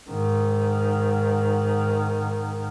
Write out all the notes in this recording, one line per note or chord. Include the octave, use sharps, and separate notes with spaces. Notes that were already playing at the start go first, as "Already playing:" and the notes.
G#2 D#3